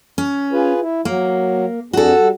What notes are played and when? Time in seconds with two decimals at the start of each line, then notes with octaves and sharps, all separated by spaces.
0.18 C#4
0.52 F4 G#4 B4
0.80 E4
1.05 F#3 A#3
1.93 F2 D4 F#4 G#4 A4
2.18 G3